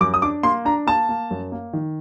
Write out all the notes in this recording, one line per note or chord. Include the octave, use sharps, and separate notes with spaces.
F#2 D6
D#6
D4 D6
A#3 C6
D4 A#5
A#3 A5
A#3
F#2
A#3
D#3